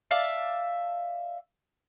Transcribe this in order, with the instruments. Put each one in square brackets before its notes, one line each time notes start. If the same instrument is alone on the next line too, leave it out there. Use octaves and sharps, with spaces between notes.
[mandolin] D5 E5 F5 A5